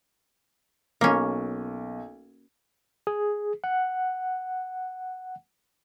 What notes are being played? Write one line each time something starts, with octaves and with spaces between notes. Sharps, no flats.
B1 A#3 C#4
G#4
F#5